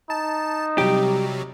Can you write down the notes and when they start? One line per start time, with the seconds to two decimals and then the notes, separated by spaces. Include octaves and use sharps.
0.10 D#4 A5
0.78 C3 F#3 G3 G4